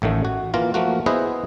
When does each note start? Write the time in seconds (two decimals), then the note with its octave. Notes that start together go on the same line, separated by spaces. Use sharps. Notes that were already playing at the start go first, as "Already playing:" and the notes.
0.02 A1 A2 D#3 A3
0.25 F#4
0.54 E3 A#3 F4 A#5
0.74 F3 A3 A#3 F#4
1.06 B3 E4 G#4 B4 C5 D#5